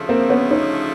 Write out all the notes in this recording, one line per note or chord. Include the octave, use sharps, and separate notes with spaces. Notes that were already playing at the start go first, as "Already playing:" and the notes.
Already playing: D2 C#3 F3 A3
A#3 C4
B3 C#4
C#4 D#4